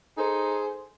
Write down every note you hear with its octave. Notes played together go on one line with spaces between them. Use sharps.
D#4 G#4 A4 C5